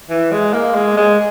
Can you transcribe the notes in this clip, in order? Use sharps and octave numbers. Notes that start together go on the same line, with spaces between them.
E3
G#3
A#3
G#3
G#3